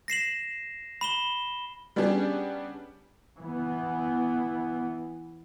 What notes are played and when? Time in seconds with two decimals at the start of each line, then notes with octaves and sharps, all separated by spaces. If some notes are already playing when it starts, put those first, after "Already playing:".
0.08 A#6 C7 E7 F#7
1.01 B5 E7 G7
1.96 G3 B3 C#4 D4 G4 G#4
3.38 E3 B3